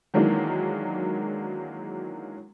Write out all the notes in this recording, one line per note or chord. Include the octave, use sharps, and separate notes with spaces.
D#3 E3 F#3 G#3 A#3 D4